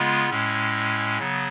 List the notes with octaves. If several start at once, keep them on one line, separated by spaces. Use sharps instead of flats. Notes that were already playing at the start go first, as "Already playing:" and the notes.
Already playing: C#3 G#3 B3 F4
A2 G#3 C#4
C#3 F#3 B3